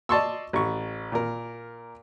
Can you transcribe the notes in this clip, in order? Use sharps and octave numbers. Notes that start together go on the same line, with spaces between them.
D5 D#5 A5 C6 C#6 E6
A1 C#6
A#2 A#4